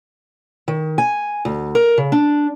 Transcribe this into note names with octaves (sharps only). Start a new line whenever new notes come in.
D#3
G#5
D2
A#4
C#3
D4